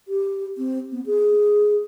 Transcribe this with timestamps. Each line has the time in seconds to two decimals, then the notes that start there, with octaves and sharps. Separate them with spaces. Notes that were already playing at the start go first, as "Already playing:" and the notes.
0.08 G4
0.58 C4
0.92 B3
1.06 G#4